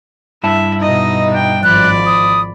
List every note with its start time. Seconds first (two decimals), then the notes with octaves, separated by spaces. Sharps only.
0.43 G2 E4 E5 A5
0.80 B2 D#4 D#5
1.31 D4 G5
1.63 G#1 F3 D5 B5 F#6
2.06 D#6